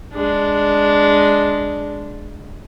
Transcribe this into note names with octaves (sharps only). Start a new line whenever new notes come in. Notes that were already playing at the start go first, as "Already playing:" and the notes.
G#3 D4